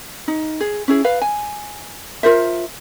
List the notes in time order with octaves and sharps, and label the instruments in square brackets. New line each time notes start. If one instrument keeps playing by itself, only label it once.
[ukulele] D#4
G#4
C#4 E4 G#4
B4 F5
G#5
F4 A#4 C5 E5